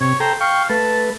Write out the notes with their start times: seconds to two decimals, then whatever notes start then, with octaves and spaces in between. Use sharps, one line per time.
0.01 C3 C#5
0.20 A4 C5 G5 A#5
0.41 F5 G5 C#6
0.69 A3 B4 A5